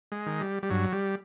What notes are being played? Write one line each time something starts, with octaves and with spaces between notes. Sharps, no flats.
G#3
D#3
G3
G3
G2 F#3
G3